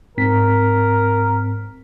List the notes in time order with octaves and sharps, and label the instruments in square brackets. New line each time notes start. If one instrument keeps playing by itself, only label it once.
[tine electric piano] G#2 C4 B6 [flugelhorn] A#4